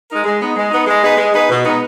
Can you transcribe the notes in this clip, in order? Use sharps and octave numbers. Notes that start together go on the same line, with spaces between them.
G#3 D#4 A#4
G#3
B3 D#4
G#3
B3 D#4
G#3
B3 D#4 G#4 B4
G#3
B3 D#4 G#4 B4
B2
G#3 B3 D#4